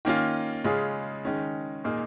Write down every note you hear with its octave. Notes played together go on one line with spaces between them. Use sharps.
D#3 A#3 C#4 F4
C#3 G#3 C#4 F4 G#4
D#3 G#3 C#4
A#2 A#3 D#4 G#4